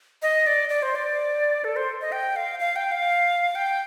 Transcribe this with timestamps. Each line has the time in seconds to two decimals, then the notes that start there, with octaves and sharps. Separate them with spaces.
0.22 D#5
0.47 D5
0.69 D5
0.82 C5
0.95 D5
1.64 A4
1.76 C5
2.01 D#5
2.12 G5
2.36 F5
2.60 F5
2.76 G5
2.92 F5
3.55 G5